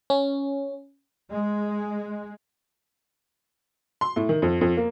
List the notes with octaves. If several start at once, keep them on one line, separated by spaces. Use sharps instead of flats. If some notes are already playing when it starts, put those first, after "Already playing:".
C#4
G#3
C6
A2
D#3
F2
F2
A#3